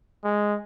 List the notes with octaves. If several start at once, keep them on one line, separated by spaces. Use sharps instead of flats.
G#3